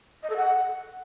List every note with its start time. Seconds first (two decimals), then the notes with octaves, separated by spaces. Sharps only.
0.23 D#5
0.30 A4
0.36 F#5